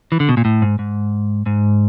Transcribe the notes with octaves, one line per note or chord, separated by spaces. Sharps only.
E3
D3
B2
A#2
A2
G#2
G#2
G#2